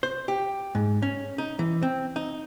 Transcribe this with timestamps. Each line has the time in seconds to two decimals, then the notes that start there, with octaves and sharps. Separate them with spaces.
0.03 C5
0.28 G4
0.75 G#2
1.02 C#4
1.38 D#4
1.59 E3
1.83 C4
2.16 D#4